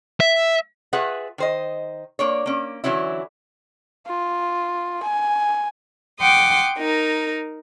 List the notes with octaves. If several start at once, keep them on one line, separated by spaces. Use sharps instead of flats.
E5
F4 G#4 B4 E5 F#5
D#3 C5 D#5
A#3 D4 C#5
A#3 C#4
D3 E3 F#3 C#4 E4
F4
G#5
F#5 G5 C6 D6 D#6
D#4 A#4